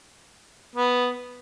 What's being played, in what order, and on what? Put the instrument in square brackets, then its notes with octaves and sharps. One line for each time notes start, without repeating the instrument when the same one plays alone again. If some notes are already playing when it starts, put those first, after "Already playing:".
[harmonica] B3